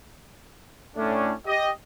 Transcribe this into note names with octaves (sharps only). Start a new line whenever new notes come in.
A2 A3 C#4 D4
G4 D#5